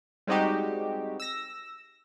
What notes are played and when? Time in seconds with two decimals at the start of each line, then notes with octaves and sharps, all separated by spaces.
0.27 G3 G#3 C4 D#4 F#4 G4
1.20 E6 A#6